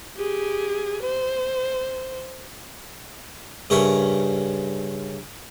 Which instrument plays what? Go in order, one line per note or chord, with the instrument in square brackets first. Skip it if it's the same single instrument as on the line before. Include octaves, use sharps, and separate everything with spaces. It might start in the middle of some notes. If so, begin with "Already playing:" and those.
[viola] G4 G#4
C5
[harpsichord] G2 C#3 A#4 C#5 E5